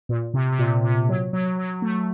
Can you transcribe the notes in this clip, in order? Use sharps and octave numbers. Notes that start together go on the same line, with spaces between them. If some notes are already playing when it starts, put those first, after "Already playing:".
A#2
C3
C3
A#2
C3
F#3
F#3
F#3
A3